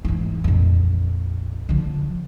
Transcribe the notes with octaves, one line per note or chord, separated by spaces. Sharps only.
G#2 E3
A#1 F2
D3 F3